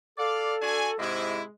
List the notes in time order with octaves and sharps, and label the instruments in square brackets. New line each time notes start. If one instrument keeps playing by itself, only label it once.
[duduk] A4 [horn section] D5 F5
[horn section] D4 F#4 G#5
[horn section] G#2 C3 E4 [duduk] G#3